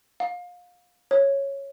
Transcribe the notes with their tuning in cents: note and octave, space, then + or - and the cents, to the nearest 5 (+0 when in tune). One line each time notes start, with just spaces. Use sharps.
F5 +30
C#5 -5